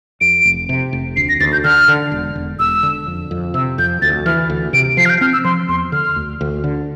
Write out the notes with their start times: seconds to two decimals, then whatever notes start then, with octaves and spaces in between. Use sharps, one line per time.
0.21 F2 D7
0.45 F1
0.69 C3
0.93 F1
1.16 D2 C7
1.29 A#6
1.40 D2 A6
1.52 G6
1.64 D3 F6
1.88 D3
2.12 E1
2.35 E1
2.59 E1 E6
2.83 D3
3.07 F2
3.31 F2
3.54 C3 E6
3.78 F2 G6
4.02 D2 A6
4.26 E3 F6
4.50 D2
4.73 C3 D7
4.97 F3 C7
5.05 F6
5.09 G6
5.20 C4 F6
5.33 E6
5.44 F3 C6
5.68 E2 C6
5.92 D3 F6
6.16 D2
6.41 D2
6.64 D3